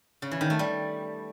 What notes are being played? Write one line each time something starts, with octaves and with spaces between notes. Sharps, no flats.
C#3
E3
D#3
A3
G3